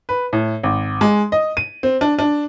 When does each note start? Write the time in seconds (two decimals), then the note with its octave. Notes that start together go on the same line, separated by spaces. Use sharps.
0.09 B4
0.33 A2
0.63 G#1
1.01 G#3
1.32 D#5
1.57 D#7
1.83 C4
2.01 D4
2.19 D4